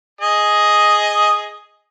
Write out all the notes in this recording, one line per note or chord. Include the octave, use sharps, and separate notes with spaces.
G#4 D#5